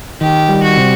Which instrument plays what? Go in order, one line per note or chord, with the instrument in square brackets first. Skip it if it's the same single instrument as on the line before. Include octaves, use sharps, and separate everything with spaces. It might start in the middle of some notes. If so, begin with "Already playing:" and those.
[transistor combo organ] D#3 [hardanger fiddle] G4
[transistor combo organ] G3
[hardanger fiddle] F#4
[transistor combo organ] C3